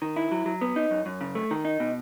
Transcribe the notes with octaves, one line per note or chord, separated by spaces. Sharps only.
D#3
E4
F#3
F#3
B3
D#4
F#2
F#2
C#3
A3
D#3
D#4
B2